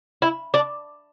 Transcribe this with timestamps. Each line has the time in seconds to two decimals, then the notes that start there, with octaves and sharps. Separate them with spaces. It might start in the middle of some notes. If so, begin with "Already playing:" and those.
0.22 E4
0.54 D4